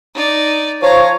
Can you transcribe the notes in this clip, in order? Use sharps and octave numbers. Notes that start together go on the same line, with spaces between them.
D#4 D5
F3 C#5 F5 A#5